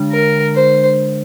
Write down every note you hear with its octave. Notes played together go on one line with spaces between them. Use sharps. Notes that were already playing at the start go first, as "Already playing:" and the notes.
Already playing: D3 G#3 D4
A#4
C5